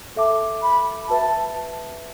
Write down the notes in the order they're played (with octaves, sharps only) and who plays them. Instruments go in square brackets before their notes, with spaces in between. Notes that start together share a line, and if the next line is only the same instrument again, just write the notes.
[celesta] A4 E5 A5 D6
[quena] B5
[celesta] F#4 B4 E5 [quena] A5